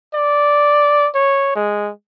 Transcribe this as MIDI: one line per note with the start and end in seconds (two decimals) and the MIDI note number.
0.15 1.08 74
1.15 1.52 73
1.55 1.91 56